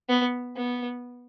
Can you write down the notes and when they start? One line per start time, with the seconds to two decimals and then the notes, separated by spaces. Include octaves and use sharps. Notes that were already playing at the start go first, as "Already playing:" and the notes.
0.09 B3
0.56 B3